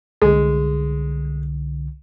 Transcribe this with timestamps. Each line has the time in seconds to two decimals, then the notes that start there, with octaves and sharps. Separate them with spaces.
0.22 C2 D3 G#3